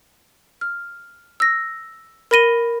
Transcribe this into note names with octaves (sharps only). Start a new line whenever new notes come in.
F6
E6 A#6
A#4 B5 A#6 D#7 G7